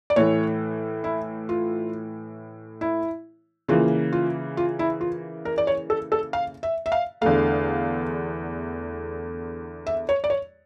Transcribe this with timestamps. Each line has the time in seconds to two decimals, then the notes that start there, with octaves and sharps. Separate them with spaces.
0.10 D5
0.16 A2 E3 A3 C#5
1.04 E4
1.49 F4
2.81 E4
3.68 C#3 E3 A#3 F4
4.13 F4
4.57 F4
4.79 E4
5.01 F4
5.45 A#4
5.58 D5
5.67 C#5
5.90 A4
6.12 A4
6.33 F5
6.63 E5
6.86 E5
6.92 F5
7.21 E2 D3 A3 F5
9.87 E5
10.09 C#5
10.24 D5
10.30 C#5